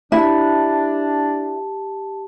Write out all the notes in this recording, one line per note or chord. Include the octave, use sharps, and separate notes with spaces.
D4 E4 G4 A5